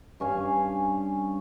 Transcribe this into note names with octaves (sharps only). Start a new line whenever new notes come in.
G2 C#4 F5 G#5